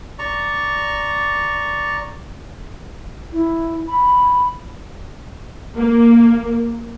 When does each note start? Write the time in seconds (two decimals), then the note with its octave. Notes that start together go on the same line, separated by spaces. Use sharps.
0.19 D5 A#5 C#6
3.32 E4
3.88 B5
5.76 A#3